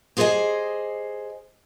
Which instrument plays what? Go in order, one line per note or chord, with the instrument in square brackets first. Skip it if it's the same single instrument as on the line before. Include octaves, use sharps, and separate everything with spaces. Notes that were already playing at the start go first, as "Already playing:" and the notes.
[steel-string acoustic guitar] G4 G#4 C5 C#5 D#5 G#5